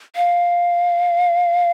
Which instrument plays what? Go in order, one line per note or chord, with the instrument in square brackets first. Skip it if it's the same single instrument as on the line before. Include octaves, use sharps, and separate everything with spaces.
[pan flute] F5